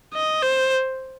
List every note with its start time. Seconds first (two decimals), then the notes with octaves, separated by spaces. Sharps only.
0.14 D#5
0.42 C5